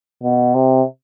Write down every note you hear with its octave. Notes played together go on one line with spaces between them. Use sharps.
B2
C3